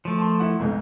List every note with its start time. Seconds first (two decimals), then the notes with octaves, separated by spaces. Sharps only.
0.05 F3 A3
0.18 A5 C6
0.40 E4 F#5
0.59 B1 F2 G#2